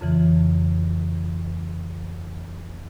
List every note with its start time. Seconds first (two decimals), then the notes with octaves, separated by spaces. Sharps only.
0.01 F2 C#3 E3